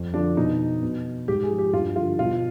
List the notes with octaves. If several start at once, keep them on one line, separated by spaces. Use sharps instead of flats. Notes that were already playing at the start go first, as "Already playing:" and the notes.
Already playing: F2
D3 F3 D4
B2 D#4
B2
G#2 G4
G#4
F3
G4
G2 F4
D3 F3 F4
B2 F4